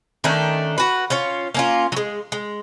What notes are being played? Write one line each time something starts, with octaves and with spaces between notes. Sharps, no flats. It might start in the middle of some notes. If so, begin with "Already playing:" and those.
D#3 A3 C#4 D4
F#4 B4
C#4 F4 C#5
A#3 C#4 F4
F#3 G#3
G#3